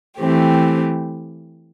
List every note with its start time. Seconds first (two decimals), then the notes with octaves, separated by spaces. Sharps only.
0.18 E3 A3 C4 G4